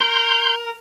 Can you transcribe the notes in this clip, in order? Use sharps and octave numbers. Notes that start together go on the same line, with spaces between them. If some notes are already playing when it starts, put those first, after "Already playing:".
A#4 C6 G6